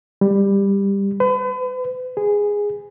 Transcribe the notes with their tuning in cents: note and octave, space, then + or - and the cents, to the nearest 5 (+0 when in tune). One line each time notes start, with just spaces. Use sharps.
G3 +15
B4 +40
G#4 -10